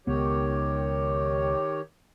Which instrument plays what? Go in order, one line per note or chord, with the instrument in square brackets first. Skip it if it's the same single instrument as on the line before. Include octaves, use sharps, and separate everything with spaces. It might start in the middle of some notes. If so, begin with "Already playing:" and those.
[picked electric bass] C#2 B3 [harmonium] D#3 G4 C#5